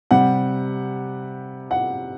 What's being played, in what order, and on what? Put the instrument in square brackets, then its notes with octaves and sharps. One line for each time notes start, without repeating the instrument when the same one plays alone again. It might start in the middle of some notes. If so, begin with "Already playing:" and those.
[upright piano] C3 G3 F#5
F#5